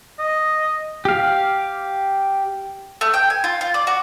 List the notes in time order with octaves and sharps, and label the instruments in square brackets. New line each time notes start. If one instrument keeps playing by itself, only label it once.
[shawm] D#5
[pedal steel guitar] G4 F5
[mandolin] A3
G5
G#5
F4
F4
D5
F#4